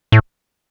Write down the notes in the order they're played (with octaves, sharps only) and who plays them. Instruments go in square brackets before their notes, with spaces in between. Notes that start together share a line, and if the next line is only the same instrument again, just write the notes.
[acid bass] A2